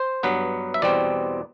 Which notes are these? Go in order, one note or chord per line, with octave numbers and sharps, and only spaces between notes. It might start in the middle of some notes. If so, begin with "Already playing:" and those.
Already playing: C5
G2 F#3 B3 B4
E5
E2 B2 G3 C4 D5